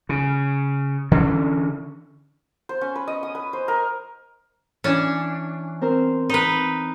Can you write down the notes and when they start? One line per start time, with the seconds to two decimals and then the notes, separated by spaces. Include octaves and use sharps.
0.09 C#3
1.12 D3 E3 C#4
2.69 C5
2.81 C#4
2.96 B4
3.08 D#5
3.23 D#6
3.35 B4
3.53 C5
3.68 A#4
4.84 E3 C#4 D4 G#5
5.81 C4 A#4 C5
6.30 D#4 B4 A#5 B5